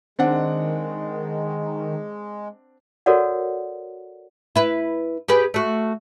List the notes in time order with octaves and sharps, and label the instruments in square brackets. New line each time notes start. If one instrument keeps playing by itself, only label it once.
[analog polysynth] D#3 [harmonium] G#3 [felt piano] C4 D4 F#5
[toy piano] F#4 A4 A#4 C#5 D5 F#5
[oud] E4 B4
G4 G#4 B4
A3 F#4